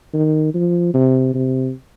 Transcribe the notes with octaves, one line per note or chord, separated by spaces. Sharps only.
D#3
F3
C3
C3